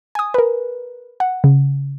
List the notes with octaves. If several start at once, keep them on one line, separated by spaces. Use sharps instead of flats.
G#5 D#6
A#4 B4
F#5
C#3